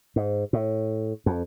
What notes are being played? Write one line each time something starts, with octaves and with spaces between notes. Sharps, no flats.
G#2
A2
F2